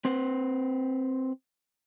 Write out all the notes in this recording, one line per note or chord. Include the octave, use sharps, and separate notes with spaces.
C4 B4 C5